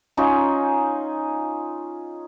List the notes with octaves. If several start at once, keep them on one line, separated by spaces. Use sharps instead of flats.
C#4 D#4 F4 G#4